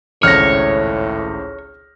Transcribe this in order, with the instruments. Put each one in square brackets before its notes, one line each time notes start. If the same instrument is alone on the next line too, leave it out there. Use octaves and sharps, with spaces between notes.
[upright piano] G#1 C#2 F#6 [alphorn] A2 [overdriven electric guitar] C#5 [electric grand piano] F6 A#6